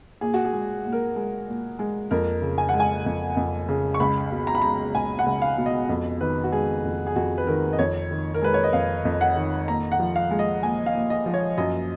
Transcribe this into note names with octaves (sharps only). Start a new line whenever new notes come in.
A#2 G#4
F#4
G#4
G#3
A#2
A#4
G#3
A#2
G#3
F2 A#4
C#3
G#5
F#5
G#3
G#5
F2
F2
C#3
C#6
C#2 B5
B2
A#5
B5
G#3 A#5
C#2 G#5
F#5
C#2
F5
B2
D#5
F2
D#3 B4
F#4
G#3 G#4
F2
G#4
F2 F#4
B4
D#3 A#4
D#5
F2 C#5
D#3
A#4
G#3 B4
C#5
D#5
F2 F5
F2
F#5
D#3
A#2 A#5
F#5
F3
F5
G#3
D#5
A#2 G#5
F5
A#2
D#5
F3
C#5
F#2 D#5